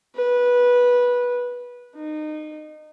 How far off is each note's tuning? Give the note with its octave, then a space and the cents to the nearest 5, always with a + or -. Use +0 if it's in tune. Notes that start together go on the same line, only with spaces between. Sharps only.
B4 -15
D#4 -25